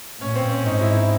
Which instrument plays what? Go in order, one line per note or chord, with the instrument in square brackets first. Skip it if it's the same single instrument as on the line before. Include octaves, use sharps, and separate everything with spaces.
[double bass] A#2 [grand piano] C#4
[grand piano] C4
C#4
[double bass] G#2 [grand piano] D#4
[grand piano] E4
D#4